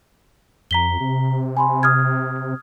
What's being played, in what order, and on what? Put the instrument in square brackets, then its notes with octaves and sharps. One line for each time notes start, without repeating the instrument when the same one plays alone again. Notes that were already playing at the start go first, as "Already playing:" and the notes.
[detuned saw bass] F2 [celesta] A#5 B6 G7
[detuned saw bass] C3
[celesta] G#5 B5 C6
D#6 F6 G#6